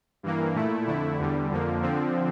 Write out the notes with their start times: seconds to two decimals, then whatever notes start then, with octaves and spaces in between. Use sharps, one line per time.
0.23 G2 E3 A#3
0.55 A#2 A3 E4
0.87 F2 D3 A3 E4
1.19 E2 D3 G3
1.51 F2 D3 F3 A#3
1.82 D3 F3 C4